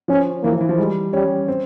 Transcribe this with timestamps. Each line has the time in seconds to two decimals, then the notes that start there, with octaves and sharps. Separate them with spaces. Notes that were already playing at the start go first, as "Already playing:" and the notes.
0.08 F3 C#4
0.43 E3 A#3
0.52 F3
0.61 E3
0.69 F3
0.78 G3 G#3
1.13 G3 C#4
1.48 C4